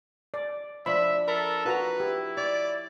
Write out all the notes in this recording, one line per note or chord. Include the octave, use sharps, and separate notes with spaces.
D5
F3 D4 E5 B5
A4 A#4 B5
F4 F#4 B4 A#5
E4 G4
C#5 D5